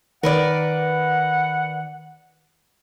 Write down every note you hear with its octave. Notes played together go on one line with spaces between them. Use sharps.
D#3 A#4 B4 D5 F#5